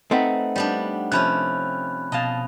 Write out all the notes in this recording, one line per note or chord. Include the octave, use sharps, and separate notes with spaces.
A3 C4 D#4 B4 F#5
G3 B3 D4
C3 F3 C#4 B5 F#6
B2 D#5 F5 A5